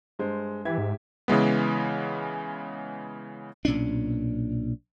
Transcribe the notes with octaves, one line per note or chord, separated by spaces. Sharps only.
G2 G#3 C5
E3 G4 E5 G#6
G#2
C#3 E3 G#3 B3
B1 A#2 C#4 D4